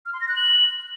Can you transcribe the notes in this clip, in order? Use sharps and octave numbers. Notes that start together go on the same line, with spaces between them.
F6
C6
A#6
F#6
F#7